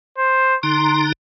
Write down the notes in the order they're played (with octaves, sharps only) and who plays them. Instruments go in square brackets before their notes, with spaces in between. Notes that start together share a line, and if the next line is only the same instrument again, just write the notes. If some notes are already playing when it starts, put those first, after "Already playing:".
[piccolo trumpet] C5
[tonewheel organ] D3 D#4 A#5 [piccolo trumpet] C6